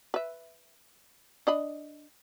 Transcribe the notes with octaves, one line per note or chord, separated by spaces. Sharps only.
B4 E5
D4 D#5 B5